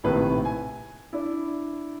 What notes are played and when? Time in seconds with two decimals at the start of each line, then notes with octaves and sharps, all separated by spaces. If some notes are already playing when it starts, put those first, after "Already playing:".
0.04 A#1 A2 C3 D#3 B4
0.45 G#5
1.13 D4 E4